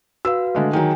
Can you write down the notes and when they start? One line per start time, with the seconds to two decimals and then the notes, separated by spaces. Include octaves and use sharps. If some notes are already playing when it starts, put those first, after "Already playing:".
0.25 F#4 B4 F5 E6
0.55 D3 G#3 A3
0.73 D#3 F#3 G#4 G5 G#5